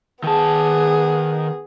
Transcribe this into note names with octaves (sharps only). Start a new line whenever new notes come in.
D#3 B3 G#4 A5